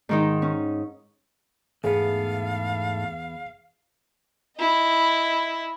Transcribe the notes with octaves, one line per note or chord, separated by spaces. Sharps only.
G#2 D#3 D#4
C#4
E2 G#2 A3 B3 G#4 F5
E4 D#5